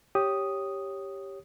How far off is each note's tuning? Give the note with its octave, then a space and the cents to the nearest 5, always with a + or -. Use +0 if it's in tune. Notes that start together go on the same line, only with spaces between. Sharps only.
G4 +0 C#5 -5 D#6 +0